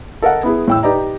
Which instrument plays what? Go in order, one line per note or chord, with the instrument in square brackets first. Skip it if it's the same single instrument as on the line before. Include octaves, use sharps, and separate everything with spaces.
[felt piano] A4 A#4 D#5 F#5
B3 E4 G#4
A2 G5 E6
D#4 G4 B4 D5 D#5 A#5